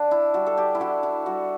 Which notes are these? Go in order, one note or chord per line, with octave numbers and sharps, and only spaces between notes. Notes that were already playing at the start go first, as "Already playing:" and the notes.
Already playing: D3 D4
E4
G3 F#4
A4
G4
E4
D3 F#4
E4
G3 F#4